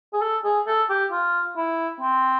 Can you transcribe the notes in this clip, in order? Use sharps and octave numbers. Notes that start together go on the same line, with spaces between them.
G#4
A4
G#4
A4
G4
F4
E4
C4